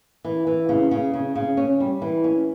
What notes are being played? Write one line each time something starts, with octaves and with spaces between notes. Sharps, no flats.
E3
E3
C#3
C#3
C#3
C#3
C#4
G3
E3
C#4